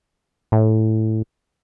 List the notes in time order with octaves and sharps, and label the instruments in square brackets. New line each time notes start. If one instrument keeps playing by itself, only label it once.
[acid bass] A2